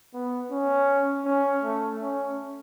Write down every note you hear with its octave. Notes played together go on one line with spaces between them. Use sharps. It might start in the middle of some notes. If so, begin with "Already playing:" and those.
B3
C#4
C#4
A3
C#4